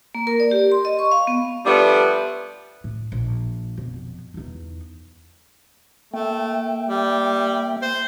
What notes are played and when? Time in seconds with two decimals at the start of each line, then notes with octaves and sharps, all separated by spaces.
0.15 A#3
0.27 A#4
0.40 D5
0.51 G4
0.72 C6
0.85 D#5
0.99 C#6
1.11 F5
1.27 B3
1.66 F3 G3 A3 B3 D4
2.84 A2
3.12 A#1
3.77 F2 B2
4.34 E2 D#4
6.14 A3 A#3 E5 G5
6.89 G3
7.82 C5